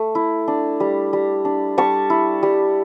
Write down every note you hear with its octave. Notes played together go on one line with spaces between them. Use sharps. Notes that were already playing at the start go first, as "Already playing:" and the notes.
Already playing: A3
E4
D4
G3
G3
D4
G3 A5 C#6
E4
G3